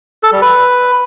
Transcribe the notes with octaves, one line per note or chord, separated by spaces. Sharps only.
A4
G3
B4